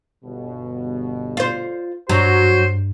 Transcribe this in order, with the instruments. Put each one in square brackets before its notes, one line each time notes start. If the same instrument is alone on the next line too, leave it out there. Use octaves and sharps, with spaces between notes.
[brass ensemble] G1 B2
[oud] F4 C5
[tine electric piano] G2 [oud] F#3 [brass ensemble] F#4 [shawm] C5